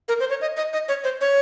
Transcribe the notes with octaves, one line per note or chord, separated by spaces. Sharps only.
A#4
C5
C#5
D#5
D#5
D#5
C#5
C5
C#5